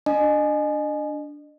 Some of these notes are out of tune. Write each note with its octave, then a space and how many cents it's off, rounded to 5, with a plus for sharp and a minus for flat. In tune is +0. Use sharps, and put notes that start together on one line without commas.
D4 +0 D#5 -35 G#5 +20